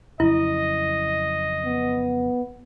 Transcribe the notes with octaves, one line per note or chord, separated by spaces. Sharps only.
F2 C#3 F#3 E4 D#5
B3